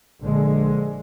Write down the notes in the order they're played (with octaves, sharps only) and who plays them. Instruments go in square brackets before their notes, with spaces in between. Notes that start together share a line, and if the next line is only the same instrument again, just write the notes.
[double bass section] A#1 D3 G#3